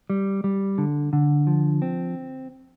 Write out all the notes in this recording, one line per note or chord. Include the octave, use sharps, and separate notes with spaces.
G3
G3
D3
D3
F3
C4